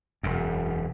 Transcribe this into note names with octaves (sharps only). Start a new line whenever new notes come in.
E1 F#2